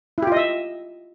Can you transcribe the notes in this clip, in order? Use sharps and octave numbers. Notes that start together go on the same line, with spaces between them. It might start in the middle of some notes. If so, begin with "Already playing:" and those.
E4 F4 G4 D#5 E5